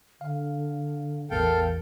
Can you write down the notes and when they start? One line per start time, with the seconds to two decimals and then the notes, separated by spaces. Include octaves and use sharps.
0.21 D3 F5
1.30 A1 E2 A4 A#4 F5 G5